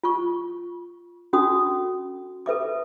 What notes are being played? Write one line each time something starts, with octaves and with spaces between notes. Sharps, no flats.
F4 C#6
C#4 D4 F#4 A4 D#6
A4 B4 E5 D6